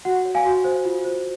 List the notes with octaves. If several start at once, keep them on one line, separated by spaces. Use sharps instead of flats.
F#4 F#5
C#5
F5 G#5
F#4
C5
F4
C5